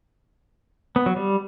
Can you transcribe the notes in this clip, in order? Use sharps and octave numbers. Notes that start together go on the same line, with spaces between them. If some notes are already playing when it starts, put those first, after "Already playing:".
B3
F#3
G3